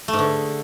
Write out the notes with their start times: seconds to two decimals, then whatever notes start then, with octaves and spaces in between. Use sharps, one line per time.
0.08 A3
0.13 G#2
0.19 D3